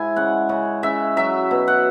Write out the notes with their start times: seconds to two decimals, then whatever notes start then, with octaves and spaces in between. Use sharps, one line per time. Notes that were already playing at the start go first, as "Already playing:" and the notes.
Already playing: G#2 G#3 E4 G#5
0.16 C#3 F#5
0.49 C#3
0.83 C#3 E5
1.17 F#3 E5
1.51 B2
1.68 F#5